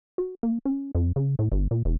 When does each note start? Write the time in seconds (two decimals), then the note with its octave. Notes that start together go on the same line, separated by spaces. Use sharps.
0.18 F#4
0.43 A#3
0.65 C#4
0.95 F2
1.16 C#3
1.39 A2
1.52 G1
1.71 A#2
1.85 E1